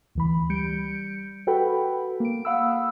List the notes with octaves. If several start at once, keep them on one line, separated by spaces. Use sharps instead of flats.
D2 E3 B5
G3 G6 C#7 D7
F#4 A4 B4 F#5 G5 B5
A#3 D7
F5 F#5 B5 D#6 E6